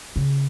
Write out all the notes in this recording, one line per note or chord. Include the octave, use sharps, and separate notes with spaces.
C#3